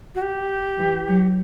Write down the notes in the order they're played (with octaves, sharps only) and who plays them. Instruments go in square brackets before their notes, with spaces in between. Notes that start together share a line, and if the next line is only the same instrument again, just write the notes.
[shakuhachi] F#4
G4
[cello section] E3
F#3